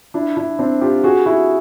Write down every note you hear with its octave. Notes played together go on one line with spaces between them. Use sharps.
D4 E4
D4 E4
C4 D4
F4 G4
F#4 G#4
E4 F#4